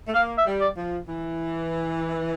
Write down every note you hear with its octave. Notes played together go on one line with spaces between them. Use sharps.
A3
A#3 F5
E5
G3
D5
F3
E3